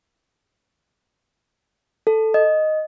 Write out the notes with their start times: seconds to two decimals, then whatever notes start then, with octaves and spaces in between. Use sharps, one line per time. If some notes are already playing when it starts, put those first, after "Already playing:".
2.07 A4
2.34 D#5